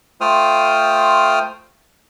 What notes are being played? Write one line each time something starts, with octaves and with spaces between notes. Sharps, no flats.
A3 F4 C5 G5 D#6 F6